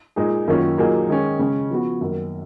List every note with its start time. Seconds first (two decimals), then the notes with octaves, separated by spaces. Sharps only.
0.16 A#2 G#3 D#4 G#4
0.47 F#2 D#3 A#3 C#4 F4
0.78 A#2 F#3 A#3 D#4 G#4
1.09 D#3 G#3 C#4 G#4
1.39 C#3 G#3 C#4
1.70 F3 B3 F#4
2.01 F#2 D#3 A#3